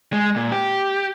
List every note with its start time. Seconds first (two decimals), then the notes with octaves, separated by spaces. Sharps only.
0.13 G#3
0.36 A#2
0.52 G4